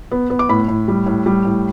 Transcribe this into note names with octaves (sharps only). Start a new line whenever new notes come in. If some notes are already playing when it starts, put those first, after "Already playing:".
B3
B3
D6
A2 B5
A2
G3
A2
G3
A2